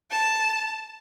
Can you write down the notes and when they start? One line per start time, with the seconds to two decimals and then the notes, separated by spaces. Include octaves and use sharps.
0.10 A5